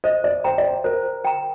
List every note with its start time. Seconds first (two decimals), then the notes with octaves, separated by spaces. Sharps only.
0.04 C5 D#5
0.24 D5
0.44 C5 G5 A#5
0.58 D5
0.65 C5
0.84 A#4 C5
1.25 G5 A#5